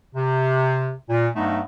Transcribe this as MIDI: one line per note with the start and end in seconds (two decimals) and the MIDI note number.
0.15 0.91 48
1.09 1.26 46
1.35 1.60 43
1.35 1.60 54
1.35 1.60 57
1.35 1.60 59
1.35 1.60 63